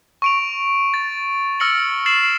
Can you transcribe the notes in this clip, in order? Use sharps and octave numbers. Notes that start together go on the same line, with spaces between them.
C#6 D7 F7
A6
E6 F6 A#6 C#7 F#7
A6 C7 E7 F#7